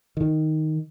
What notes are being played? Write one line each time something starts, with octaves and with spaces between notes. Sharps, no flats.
D#3